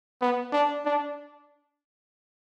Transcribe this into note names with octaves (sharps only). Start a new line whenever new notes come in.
B3
D4
D4